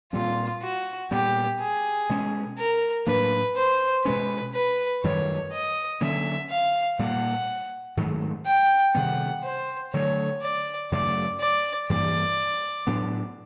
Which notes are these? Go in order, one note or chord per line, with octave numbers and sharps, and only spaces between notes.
A#2 G3 C4 F4
F#4
A#2 G3 B3 G4
G#4
B2 G#3 C#4
A#4
A2 F#3 A#3 D4 B4
C5
B2 G#3 C#4 B4
B4
F#2 D#3 G3 C#5
D#5
D3 F#3 A#3 C#4 E5
F5
A#2 G3 A#3 F#5
G#2 D#3 F#3 A3
G5
C3 D#3 G3 B3 F#5
C5
D3 F#3 A3 C#5
D5
F#2 C#3 F#3 A3 D5
D5
G2 E3 G3 A#3 D5
A2 F#3 B3 D4